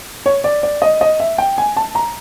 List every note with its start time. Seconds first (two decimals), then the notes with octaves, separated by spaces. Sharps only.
0.26 C#5
0.44 D5
0.63 D5
0.82 D#5
1.01 D#5
1.20 E5
1.38 G5
1.58 G#5
1.77 A5
1.95 A#5